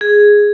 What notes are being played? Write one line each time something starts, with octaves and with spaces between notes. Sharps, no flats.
G#4